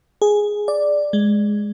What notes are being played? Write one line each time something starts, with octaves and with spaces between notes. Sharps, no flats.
G#4
D5
G#3